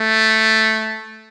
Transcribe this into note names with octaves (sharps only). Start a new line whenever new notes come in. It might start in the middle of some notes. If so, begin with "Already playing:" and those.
Already playing: A3